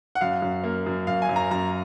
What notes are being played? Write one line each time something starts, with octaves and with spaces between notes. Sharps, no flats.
F#5
F#2 F5
F#2
A#3
F#2
F#2 F5
G#5
F#2
A#5
F#2 A#5